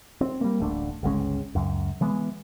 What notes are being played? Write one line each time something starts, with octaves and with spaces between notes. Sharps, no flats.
C4
G3 A#3
D1 A1 A3 D4
G1 C#2 G#3 C#4
C#2 F#2
E3 G#3 B3